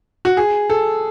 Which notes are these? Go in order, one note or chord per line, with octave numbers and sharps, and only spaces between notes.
F#4
G#4
A4